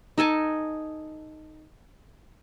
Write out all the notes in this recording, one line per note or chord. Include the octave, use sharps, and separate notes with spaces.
D#4 A4 G#5 A5